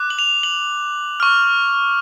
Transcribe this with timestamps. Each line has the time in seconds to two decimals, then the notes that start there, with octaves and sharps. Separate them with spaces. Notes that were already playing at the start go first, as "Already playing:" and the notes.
Already playing: D6 F#6
0.10 F#7
0.19 F7
0.43 F#7
1.20 C#6 F6